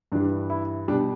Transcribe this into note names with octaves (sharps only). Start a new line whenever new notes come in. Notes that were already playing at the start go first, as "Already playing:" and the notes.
G2 E3 G3 D4
E4
B2 G3 D4